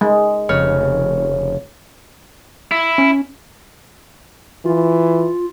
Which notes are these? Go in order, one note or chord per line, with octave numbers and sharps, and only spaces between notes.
G#3
F1 C#3 C#5 F6
E4
C#4
E3 F4